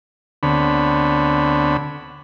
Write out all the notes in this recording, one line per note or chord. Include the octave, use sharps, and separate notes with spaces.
D2 D3 B3 C4 C#5 B5